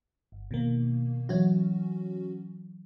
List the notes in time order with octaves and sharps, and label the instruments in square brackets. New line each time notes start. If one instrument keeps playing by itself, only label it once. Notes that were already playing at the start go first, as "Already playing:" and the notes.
[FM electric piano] G1
B2 D#3 A#3
[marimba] E3 F#3 [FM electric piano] C#4 F#4